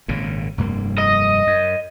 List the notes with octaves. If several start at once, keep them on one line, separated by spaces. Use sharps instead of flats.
G#1 A#2 C#3
F1 G2 A#3
D#5
F#2